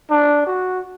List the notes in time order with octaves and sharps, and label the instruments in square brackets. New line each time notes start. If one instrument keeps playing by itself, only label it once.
[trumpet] D4
F#4